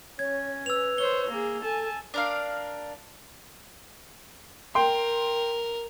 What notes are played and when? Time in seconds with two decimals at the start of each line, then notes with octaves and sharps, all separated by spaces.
0.19 C#4 C#5 G#6
0.66 B4 E6 F7
0.98 C5 C#5 G7
1.31 A#3 G#4
1.63 A4 G#5 A5
2.14 D4 A#4 F5
4.75 A#4 G5 C6